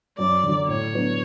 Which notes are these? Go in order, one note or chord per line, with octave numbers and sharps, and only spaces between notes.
F#2 D5
D3 F#3
A2 C#5
F#3 B3 D4